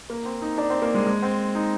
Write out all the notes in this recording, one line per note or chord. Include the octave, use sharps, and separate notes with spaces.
A#3
C4
D#4
D4
C4
A#3
G#3
G#3
C4
D#4